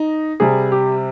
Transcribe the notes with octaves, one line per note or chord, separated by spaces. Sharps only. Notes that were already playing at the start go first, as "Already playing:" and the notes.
Already playing: D#4
C3 G3 G#4
G4